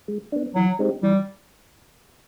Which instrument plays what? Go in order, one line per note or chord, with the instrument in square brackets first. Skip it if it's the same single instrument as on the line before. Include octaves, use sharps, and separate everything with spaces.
[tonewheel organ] G#3
B3 D4
[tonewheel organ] E3 [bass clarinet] F#3
[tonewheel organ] G#3 C4 D#4 G4
[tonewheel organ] E3 [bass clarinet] G3